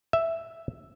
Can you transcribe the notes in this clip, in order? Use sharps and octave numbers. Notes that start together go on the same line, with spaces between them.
E5